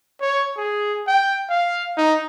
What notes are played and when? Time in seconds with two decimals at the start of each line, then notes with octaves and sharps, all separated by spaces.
0.21 C#5
0.57 G#4
1.07 G5
1.49 F5
1.97 D#4